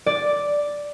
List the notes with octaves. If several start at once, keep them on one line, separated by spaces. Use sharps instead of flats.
D5